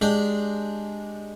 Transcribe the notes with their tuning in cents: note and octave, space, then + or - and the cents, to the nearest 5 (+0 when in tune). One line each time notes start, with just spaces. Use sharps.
G#3 +0 D4 +0 G4 +0